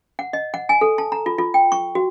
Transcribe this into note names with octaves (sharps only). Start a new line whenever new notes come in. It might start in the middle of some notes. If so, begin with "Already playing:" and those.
F#5
D#5
F#5
G#5
A4
A5
A#5
F4
F4
G5
C#6
F#4